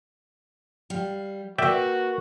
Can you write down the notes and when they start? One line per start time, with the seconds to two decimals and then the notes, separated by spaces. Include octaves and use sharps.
0.90 G3 F5
1.58 A#3 F#4 B4 D5 E5 G5